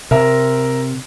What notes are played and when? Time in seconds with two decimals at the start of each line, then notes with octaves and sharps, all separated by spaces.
0.11 C3 A#4 E5 A#5